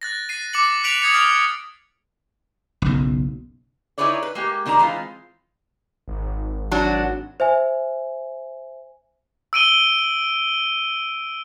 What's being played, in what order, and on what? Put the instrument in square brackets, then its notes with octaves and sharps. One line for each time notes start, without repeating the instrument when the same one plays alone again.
[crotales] F#6 A6 A#6
A6 C7 D#7
D6 A6 C#7 F#7
F#6 B6 D7 F7 F#7
D#6 G#6 A6 C#7 F7
D#6 F6 C7 F7
[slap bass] F#1 B1
[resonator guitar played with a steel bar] D#4 E4 G#4 B4 C#5 D5
B4
G#3 A#3 G4
C3 D#3 D4 G4 A#5
E3 G#3 C4 F4
[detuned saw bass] G#1
[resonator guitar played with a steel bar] F#3 D4 F#4
[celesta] C5 E5 G#5
[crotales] E6 D7 D#7 G7